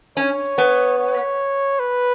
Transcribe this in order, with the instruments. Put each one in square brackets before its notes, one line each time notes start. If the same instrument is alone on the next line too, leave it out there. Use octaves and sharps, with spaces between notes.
[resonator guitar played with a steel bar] C#4 [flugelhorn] C#5
[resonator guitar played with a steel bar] B3
[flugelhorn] C#5
B4